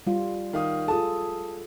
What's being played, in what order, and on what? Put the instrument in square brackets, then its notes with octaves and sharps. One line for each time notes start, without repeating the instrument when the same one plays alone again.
[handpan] G3 F4
[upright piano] D#3 F5 D#6
[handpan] F4 G#4 A4 [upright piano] A5 D#6